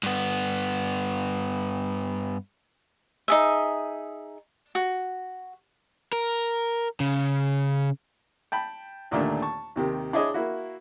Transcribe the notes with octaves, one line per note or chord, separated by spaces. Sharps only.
G2 B3
D#4 G#4 E5
F#4
A#4
C#3
G5 A5 B5
D#2 A#2 D3 D#3 A3 D4
A5 C#6
D#2 C3 D#3
D4 E4 G#4 C#5 D#5
A#3 E4 F#4